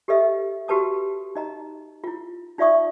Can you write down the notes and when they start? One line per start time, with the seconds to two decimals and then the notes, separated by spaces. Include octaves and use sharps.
0.08 G4 A4 B4 D#5 E5
0.68 F#4 G4 B4 A5 D#6
1.35 D#4 D#5 A#5
2.04 E4 F4
2.58 D#4 F4 D5 E5 C#6 D#6